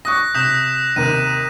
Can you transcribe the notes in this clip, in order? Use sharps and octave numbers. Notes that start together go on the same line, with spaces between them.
C#6 D#6 F#6 A#6
C3 D#6 G6 B6 E7
D#2 C3 A#4 D#7